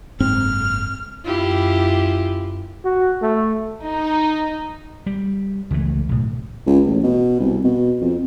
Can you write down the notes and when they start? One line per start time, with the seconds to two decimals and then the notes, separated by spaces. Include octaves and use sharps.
0.20 F#1 G#2 C4 F6
1.25 F#2 E4 F4 G4
2.85 F#4
3.22 A3
3.86 D#4
5.06 G3
5.71 C#2 E3 A3
6.09 B1 A2
6.66 C#2
6.87 A1
7.03 B2
7.40 C2
7.64 B2
8.02 F2